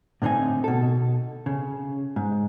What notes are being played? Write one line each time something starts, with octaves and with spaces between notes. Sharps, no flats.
A2 D3 C4 D#4 G#5
B2 A4
C#3
G#2